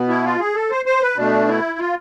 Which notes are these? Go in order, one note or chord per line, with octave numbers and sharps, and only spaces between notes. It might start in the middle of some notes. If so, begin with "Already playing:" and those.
Already playing: B2 B3
E4
F4
G#4
A4
C5
C5
B4
B2 A3 D4
E4
F4